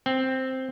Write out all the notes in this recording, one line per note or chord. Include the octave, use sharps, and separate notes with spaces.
C4